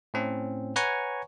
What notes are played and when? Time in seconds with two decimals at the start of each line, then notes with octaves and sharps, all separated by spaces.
0.14 A2 C4 C#4
0.76 B4 C#5 F#5 G#5 A#5 C#6